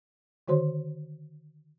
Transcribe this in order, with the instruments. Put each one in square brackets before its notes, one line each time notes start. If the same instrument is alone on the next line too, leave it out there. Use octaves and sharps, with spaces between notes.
[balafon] D3 D#3 F#4 C5 C#5 C6